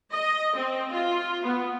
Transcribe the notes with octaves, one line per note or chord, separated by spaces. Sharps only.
D#5
C4
F4
B3